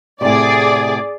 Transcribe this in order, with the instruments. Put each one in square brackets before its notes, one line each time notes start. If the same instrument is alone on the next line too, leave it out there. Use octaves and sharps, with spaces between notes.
[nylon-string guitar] A2 C3 [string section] G#4 D5